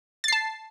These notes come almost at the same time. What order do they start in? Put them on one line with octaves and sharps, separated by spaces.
A6 C7 A5